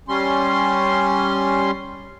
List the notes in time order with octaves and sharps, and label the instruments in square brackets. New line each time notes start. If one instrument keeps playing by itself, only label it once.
[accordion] G3 C#4 C6